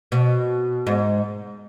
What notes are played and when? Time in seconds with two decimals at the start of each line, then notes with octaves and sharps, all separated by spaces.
0.12 B2
0.87 G#2